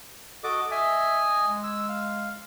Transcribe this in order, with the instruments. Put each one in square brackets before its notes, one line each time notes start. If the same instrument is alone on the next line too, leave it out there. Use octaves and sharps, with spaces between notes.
[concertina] F#4 D#5 D6 [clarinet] A4
[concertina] D#5 G#5 [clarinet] E5
[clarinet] G#3
[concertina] E6
F5